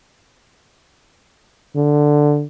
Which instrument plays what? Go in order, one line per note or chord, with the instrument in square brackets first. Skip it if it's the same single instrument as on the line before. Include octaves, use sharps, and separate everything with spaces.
[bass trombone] D3